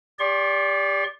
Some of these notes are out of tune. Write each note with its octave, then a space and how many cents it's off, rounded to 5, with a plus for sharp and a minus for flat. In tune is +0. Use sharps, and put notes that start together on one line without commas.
G4 +25 D5 -20 C6 +40